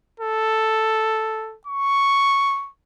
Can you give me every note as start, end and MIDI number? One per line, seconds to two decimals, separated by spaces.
0.20 1.56 69
1.67 2.70 85